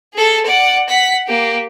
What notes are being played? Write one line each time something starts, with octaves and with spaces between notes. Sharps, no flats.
G#4 A4
D5 F#5
F#5 B6
A#3 G4